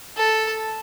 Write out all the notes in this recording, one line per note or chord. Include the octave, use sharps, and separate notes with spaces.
A4